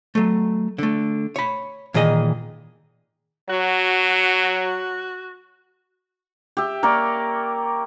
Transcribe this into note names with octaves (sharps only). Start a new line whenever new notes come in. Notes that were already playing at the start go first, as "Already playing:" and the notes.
F#3 A3
D3 A3
C#5 B5
A#2 D#3 E3 G#4 D#5
F#3 F#4
G4 E5
A#3 A#4 C#5 D5